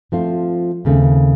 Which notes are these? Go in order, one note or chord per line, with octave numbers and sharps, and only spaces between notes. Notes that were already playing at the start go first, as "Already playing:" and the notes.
F3 A3 C4 F4
D#2 C#3 A3 C4